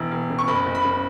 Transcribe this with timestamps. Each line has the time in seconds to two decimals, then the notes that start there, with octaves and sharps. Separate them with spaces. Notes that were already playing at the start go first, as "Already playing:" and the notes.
Already playing: E1 E3
0.11 E1
0.30 C#3
0.39 C#6
0.48 F#1 B5
0.66 F#1
0.75 B5
0.85 C#3